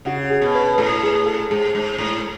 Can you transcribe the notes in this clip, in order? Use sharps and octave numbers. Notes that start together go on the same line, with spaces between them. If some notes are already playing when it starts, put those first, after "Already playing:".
C#3 F#4
G#4
B2
B4
A2 A4
G#4
A4
G#2 G#4
G#2
A2